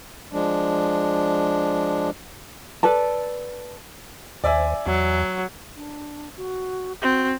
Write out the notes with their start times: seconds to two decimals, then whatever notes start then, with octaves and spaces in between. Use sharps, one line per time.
0.33 F3 G#3 D4
2.83 A4 B4 D5 A5
4.44 D#2 C5 D5 E5 G#5
4.86 E2 F#3
5.76 D4
6.37 F#4
7.02 C4 F#4